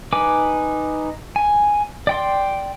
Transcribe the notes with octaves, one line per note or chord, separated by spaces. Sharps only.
D#4 B4 G#5 D6
G#5
D5 G5 C6